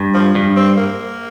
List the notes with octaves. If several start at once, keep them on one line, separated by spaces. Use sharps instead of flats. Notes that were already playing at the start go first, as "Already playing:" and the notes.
Already playing: G2
F3
G2
C4
A#3